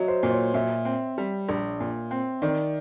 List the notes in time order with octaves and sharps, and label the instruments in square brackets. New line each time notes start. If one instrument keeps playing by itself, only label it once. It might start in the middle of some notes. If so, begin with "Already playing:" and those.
Already playing: [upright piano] F#3 [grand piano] C#5 D#5 E5
[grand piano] C5
[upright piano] A#2
[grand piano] C#5
[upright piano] A#2 [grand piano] E5
[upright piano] C4
G3
A#1
A#2
C4
[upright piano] D#3 [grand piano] D5